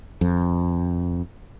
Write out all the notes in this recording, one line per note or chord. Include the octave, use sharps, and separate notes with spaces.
F2